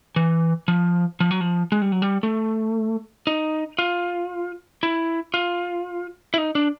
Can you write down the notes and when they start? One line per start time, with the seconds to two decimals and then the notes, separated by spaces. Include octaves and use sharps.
0.16 E3
0.68 F3
1.20 F3
1.31 F#3
1.41 F3
1.72 G#3
1.82 G3
1.92 F#3
2.02 G3
2.23 A3
3.27 D#4
3.78 F4
4.83 E4
5.34 F4
6.34 E4
6.38 D#4
6.55 D4